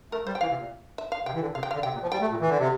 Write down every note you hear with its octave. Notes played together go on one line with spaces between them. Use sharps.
A3 A#4
G3 C5
G5
E3 F5
C3
A#2
E5
F5
C3 G5
E3
D3
C3 F5
G5
D3 F5
C3 G5
A#2
F3
G3 G5
A3
A#2
E3
D3
C3